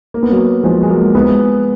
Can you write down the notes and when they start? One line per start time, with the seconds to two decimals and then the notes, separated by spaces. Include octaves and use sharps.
0.14 A#3
0.23 B3
0.31 F#3 A#3
0.64 F3 G#3
0.82 G#3
0.90 F#3 A#3
1.15 G#3 B3